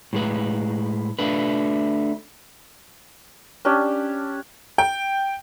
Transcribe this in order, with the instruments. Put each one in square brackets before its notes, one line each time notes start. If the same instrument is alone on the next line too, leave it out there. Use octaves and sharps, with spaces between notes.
[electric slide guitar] A2 G#3 B4
A3 D4 B4
[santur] C#4 D4 G4
[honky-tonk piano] G5